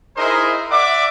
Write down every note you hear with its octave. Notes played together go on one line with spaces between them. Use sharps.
D#4 E4 G#4 A#4 C5 D#5
D5 E5 F#5 D6